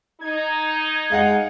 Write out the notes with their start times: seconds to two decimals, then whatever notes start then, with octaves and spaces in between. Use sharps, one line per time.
0.21 D#4 G#6
1.12 G#3 F5 F#5